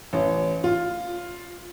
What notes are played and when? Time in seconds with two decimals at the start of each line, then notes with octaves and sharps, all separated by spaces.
0.13 A1
0.64 F4